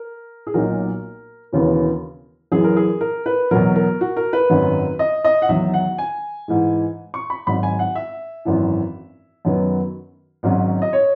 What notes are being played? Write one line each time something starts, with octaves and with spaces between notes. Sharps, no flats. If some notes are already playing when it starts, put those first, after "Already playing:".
Already playing: A#4
G#4
B1 A#2 F#3 A#3 D#4 A#4
E1 D#2 C#3 E3 B3
F#1 F#2 E3 G#4
A#4
G#4
A#4
B4
E2 B2 F#3 A#4
A#4
F#4
A#4
B4
G#1 F#2 D#3 F#3
D#5
D#5
F#5
E2 D#3 F#3 E5
F#5
G#5
G#2 E3 G#3
C#6
B5
G#1 G#2 F#3 B5
G#5
F#5
E5
G#1 F#2 E3
F#2 D#3 F#3 B3
G#1 G#2 F#3 C#4
D#5
C#5